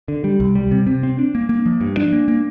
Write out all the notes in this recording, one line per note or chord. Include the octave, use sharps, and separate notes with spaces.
D3
G3
C2
G3
C3
C3
C4
D4
A#3
A#3
F3
G2
D4
A#3
A#3